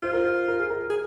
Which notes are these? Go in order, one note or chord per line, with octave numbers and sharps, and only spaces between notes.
F4 C5
A#4
C5
A#4
G#4
A#4
G#4